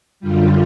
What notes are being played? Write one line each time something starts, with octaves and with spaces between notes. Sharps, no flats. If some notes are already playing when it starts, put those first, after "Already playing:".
F#2 D3 G3 F4